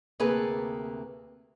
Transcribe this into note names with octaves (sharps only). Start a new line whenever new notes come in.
D2 C3 A#3 G#4 A4 B4